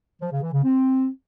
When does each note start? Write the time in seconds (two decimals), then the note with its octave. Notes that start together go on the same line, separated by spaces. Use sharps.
0.21 F3
0.31 C#3
0.42 E3
0.53 C#3
0.64 C4